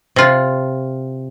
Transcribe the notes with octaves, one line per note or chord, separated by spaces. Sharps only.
C3 F4